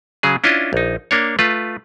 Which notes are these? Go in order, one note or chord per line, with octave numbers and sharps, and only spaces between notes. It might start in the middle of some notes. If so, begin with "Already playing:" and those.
C#3 F#3 G#4
C#4 D4 E4 F4 D#5
A#1 D#4
A#3 D4 C#5
A3 F4 B4